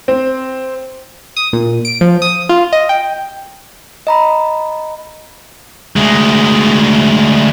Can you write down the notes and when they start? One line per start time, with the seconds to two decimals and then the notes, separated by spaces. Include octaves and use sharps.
0.08 C4
1.37 D#6
1.53 A#2
1.85 D7
2.01 F3
2.22 D#6
2.49 F4
2.73 D#5
2.89 G5
4.07 D#5 A#5 B5
5.96 D2 G#3